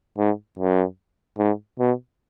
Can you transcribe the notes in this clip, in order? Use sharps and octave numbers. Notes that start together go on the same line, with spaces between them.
G#2
F#2
G#2
B2